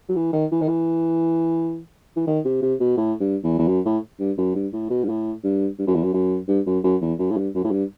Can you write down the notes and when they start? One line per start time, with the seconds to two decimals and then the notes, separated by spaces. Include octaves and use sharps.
0.09 F#3
0.16 E3
0.33 D#3
0.52 E3
0.62 D#3
0.69 E3
2.17 E3
2.27 D#3
2.45 C3
2.62 C3
2.80 B2
2.97 A2
3.20 G2
3.44 E2
3.59 E2
3.68 F#2
3.86 A2
4.20 G2
4.38 F#2
4.55 G2
4.73 A2
4.90 B2
5.04 G2
5.09 A2
5.44 G2
5.79 G2
5.87 F#2
5.95 E2
6.04 F#2
6.14 F#2
6.48 G2
6.66 F#2
6.84 F#2
7.02 E2
7.19 F#2
7.31 A2
7.37 G2
7.55 F#2
7.64 A2
7.72 G2